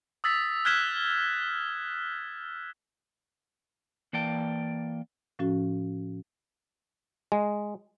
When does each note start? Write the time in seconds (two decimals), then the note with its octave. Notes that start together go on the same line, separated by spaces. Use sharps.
0.24 D#6 E6 A6 B6
0.65 F6 F#6 G#6 B6 E7 G7
4.13 E3 A#3 D5 G5 A5
5.39 A2 F3 C#4 F#4
7.32 G#3